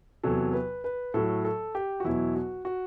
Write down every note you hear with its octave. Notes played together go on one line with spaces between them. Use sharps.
E2 C3 F#3 A4
B4
B4
A2 F#3 A4
A4
G4
F#4
E2 B2 F#3 E4
F#4
F#4